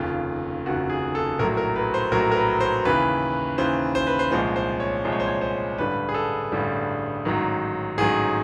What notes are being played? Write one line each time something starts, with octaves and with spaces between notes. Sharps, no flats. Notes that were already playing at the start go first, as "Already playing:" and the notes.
Already playing: F1 D#2 C#3 F4
F1 D#2 C#3 F#4
G#4
A4
A#1 A2 F#3 A#4
A#4
B4
C5
A#1 A2 F#3 A#4
A#4
B4
C5
D#2 C#3 E3 B4
D#2 C#3 E3 C5
C5
B4
C5
C2 A#2 F3 G#3 C5
C5
C#5
C2 A#2 F3 G#3
C#5
C5
C#5
C5
A1 G2 D3 G3 B4
G#4
A4
A1 G2 D3 G3
A1 G#2 D#3 F#3
A1 G#2 D#3 F#3 G#4